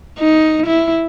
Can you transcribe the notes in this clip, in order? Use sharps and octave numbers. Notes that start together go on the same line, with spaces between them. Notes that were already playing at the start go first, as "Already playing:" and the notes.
D#4
E4